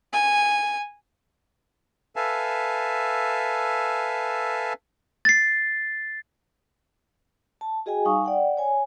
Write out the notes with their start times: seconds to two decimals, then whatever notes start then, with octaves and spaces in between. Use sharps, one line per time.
0.13 G#5
2.16 A4 B4 E5 F5 G#5 A5
5.25 A6 C7
7.61 A5
7.86 F#4 G#4 D#5 G5 G#5
8.05 G3 D#4 F5 G#5 C#6 D#6
8.25 D5 F#5 G5
8.57 C#5 G#5